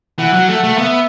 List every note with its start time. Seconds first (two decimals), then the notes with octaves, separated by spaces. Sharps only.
0.19 E3 F#5
0.33 F#3
0.48 A3 F#5
0.64 A3
0.78 B3 E5